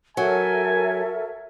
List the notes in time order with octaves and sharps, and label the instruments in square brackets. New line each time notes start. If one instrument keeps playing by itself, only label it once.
[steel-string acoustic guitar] F#3 [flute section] A4 A#4 E5 [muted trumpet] G#5